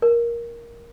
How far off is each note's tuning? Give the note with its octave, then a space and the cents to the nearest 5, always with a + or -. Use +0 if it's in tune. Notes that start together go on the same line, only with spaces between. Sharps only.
A#4 +10